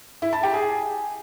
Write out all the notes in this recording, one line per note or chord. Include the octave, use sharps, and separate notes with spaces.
E4
A5
G4
G#4